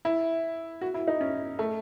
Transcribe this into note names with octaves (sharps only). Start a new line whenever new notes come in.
E4
F#4
E4
D#4
C#4
A3